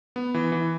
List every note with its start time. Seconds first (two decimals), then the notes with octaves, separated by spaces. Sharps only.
0.16 B3
0.34 E3
0.52 E3